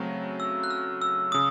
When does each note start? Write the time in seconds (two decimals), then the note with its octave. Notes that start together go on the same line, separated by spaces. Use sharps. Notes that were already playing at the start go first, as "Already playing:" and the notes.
Already playing: C#3 F#3 A3 C4
0.40 E6
0.64 F#6
0.71 F6
1.02 E6
1.32 C#3 D#6